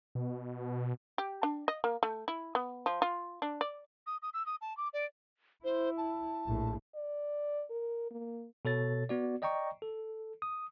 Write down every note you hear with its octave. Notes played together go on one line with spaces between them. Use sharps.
B2
G4
D4
D#5
A#3
A3
E4
B3
F3
F4
D4
D5
D#6
D#6
E6
D#6
A5
D6
D5
E4 C5
A5
A#1 A2
D5
A#4
A#3
B2 A4 C#5 A6
B3 F#4 D5
D5 D#5 G5 A#5 C#6
A4
D#6